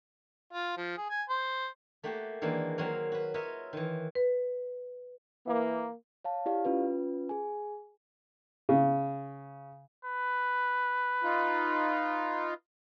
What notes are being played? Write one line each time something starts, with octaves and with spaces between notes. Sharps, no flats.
F4
F3
G#4
G#5
C5
A3 A#3 F#4 G4
D#3 E3 G#3 A#3 D4 A#4
F#3 A#3 C4 F#4 A#4 C#5
F#4 B4
F4 A#4 B4 C#5 D#5 E5
D#3 E3
B4
E3 A#3
C#5 F5 A5
E4 G4 D5 F5
C#4 F4 B4
G#4 G#5
C#3
B4
D#4 F4